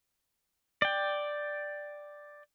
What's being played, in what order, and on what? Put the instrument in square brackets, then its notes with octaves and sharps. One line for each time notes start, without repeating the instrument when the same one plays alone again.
[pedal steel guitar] D5 G5